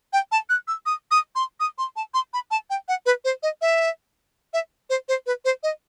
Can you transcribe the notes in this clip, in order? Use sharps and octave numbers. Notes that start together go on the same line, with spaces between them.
G5
A5
F#6
E6
D#6
D#6
C6
D#6
C6
A5
C6
B5
A5
G5
F#5
B4
C5
D#5
E5
E5
C5
C5
B4
C5
D#5